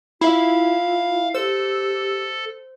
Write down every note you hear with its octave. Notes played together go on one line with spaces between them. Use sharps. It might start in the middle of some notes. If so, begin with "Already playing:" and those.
E4 F4 E5 F5 B5
G4 A4 C5 E6